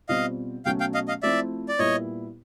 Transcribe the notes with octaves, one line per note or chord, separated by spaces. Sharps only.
B2 G3 C4 F4 D#5 F5
B2 F#3 A3 C#4 F5 G5
F5 G5
D#5 F5
D#5 F5
F3 A3 C4 E4 D5 E5
D5
A#2 G3 B3 E4 C#5 D#5